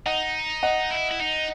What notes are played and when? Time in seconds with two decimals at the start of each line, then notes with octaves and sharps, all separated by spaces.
0.06 D#4 D#5 F#5
0.63 D#5 F#5
0.91 E4
1.11 E4
1.20 D#4